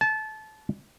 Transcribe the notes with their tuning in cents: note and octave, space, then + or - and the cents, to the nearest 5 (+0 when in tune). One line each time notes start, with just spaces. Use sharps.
A5 -25